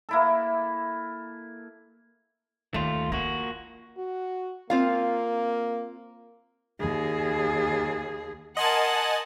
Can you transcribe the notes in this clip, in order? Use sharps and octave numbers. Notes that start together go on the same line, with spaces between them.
A#3 E4 A4
D#2 A3 F4
A#3 F4 F#4
F#4
A#3 C4 F4 F5
D#2 G#4
A#4 D#5 F#5 G#5 A5 C6